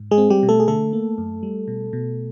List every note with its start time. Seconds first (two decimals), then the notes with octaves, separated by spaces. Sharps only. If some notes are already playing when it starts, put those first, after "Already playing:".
Already playing: G#2
0.11 G#3 G#4
0.18 C4
0.30 G3 G4
0.43 B2
0.49 A3 A4
0.60 G#4
0.68 D3 A3 A4
0.93 A#3
1.18 F#2
1.43 G3
1.68 B2
1.93 B2